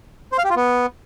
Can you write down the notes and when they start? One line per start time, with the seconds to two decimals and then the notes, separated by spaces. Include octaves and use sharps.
0.32 C5
0.38 F5
0.44 G4
0.50 F4
0.56 B3